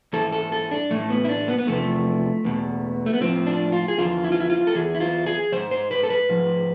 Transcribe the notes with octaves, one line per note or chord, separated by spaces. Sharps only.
G#2 E3 A4
A4
A4
D4
A2 E3 A3
B3
E4
D4
B3
B3
E2 C3 F3 A3
E2 B2
A3
B3
A2 F3 C4
D4
F4
G#4
E2 D3 F3 F4
E4
F4
E4
F4
A4
E2 C3 E3 G#4
E4
F4
G#4
G#2 E3 C5
C5
B4
A4
B4
G#2 F3